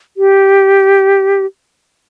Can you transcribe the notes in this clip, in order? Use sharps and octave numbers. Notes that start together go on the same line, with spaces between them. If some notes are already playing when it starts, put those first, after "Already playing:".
G4